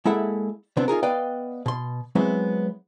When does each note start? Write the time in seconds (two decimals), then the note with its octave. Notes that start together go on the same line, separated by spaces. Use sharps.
0.05 G#3 A#3 E4 A4 E5 F#5
0.77 C3 E3 B3 C4 D4
0.88 D#4 F4 G#4 A#4
1.03 B3 B4 D5 D#5 F5 G5
1.66 B2 C6
2.15 F#3 G#3 B3 C4 E4